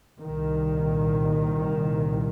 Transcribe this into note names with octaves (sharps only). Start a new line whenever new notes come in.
C2 A#2 D#3